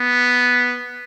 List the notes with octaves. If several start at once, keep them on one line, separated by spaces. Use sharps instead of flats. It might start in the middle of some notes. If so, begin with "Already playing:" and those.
Already playing: B3